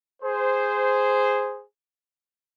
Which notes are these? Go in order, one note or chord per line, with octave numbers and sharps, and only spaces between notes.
G#4 C5